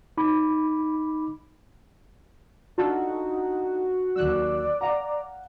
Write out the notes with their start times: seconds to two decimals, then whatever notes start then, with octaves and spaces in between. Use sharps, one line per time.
0.18 D#4 B5 D6
2.78 D4 D#4 F4 F#4 A4
4.16 D#2 F#3 D5 E6 F#6
4.81 F5 F#5 A#5